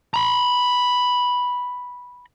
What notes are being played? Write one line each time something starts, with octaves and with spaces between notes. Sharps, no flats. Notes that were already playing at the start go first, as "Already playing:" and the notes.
A#5 B5